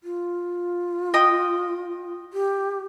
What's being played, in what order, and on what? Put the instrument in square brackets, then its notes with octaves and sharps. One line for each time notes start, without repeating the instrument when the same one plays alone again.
[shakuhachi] F4
[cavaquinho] D#5 G5 D#6
[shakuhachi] G4